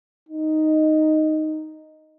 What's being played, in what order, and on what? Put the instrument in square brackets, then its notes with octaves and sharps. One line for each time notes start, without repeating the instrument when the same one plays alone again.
[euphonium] D#4